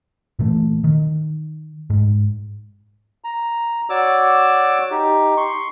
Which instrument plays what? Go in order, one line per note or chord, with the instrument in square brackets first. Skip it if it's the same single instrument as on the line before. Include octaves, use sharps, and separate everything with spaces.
[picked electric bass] A#2 E3 A3
D#3
G#2
[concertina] A#5
F#4 C#5 D5 D6 E6
D#4 G4
C6 C#6